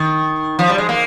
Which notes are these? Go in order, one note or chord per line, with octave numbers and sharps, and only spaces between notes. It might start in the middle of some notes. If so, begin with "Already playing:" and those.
Already playing: D#3
F3
G3
G#3
A#3